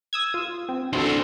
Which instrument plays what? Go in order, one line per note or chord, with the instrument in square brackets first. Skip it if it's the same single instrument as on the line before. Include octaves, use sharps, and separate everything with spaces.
[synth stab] D#6 E6 G#6
F4
C4
[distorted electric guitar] D4 C5 [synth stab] E4 F#4 A4